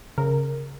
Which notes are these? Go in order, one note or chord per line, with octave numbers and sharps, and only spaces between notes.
C#3 A#4